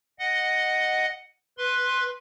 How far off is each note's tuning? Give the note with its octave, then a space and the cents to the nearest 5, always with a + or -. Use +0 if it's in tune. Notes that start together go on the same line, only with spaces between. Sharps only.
D#5 -5 F#5 +0
B4 +0 C6 +10